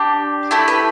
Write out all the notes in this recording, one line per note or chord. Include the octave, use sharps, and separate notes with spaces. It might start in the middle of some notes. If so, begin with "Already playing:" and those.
Already playing: D4 G4
A3 E4 G4 A4
B4